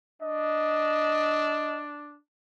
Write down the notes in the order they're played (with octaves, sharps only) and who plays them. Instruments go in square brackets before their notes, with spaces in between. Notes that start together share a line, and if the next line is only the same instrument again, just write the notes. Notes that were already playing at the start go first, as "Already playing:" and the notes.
[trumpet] D4 [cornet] D#5